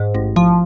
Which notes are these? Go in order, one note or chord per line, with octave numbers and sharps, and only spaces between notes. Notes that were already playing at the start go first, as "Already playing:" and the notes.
Already playing: G#2
A1
F3